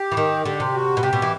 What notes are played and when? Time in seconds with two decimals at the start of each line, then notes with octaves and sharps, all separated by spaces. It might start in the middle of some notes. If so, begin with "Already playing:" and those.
Already playing: G4
0.12 E3
0.17 D#3
0.45 D3 G4
0.60 C3
0.74 F#4
0.97 B2
1.02 C3 G4
1.13 B2
1.22 E3